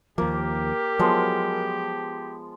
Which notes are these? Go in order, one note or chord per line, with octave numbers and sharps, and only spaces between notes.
D#2 F3 A#3 G4 A#4
F3 F#3 G#3 B3